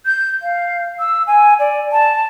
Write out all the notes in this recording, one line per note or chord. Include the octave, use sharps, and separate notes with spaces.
G6
F5
E6
G#5
D5
A5